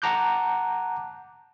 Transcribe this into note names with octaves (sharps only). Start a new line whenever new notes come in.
F#5 A5 A#5 D6 F#6 G6